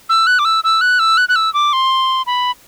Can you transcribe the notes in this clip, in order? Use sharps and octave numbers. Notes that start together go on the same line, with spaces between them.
E6
F#6
D6
E6
E6
F#6
E6
F#6
F#6
E6
D6
C6
B5